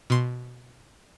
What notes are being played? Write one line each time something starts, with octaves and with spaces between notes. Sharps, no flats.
B2 C6